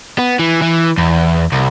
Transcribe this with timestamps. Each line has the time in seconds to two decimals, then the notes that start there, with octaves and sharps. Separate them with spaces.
0.19 B3
0.39 E3
0.62 E3
0.98 E2
1.52 C2